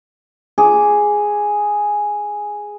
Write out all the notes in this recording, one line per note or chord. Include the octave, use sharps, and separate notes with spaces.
G#4 D6